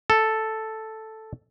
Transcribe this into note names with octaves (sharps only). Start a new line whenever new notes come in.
A4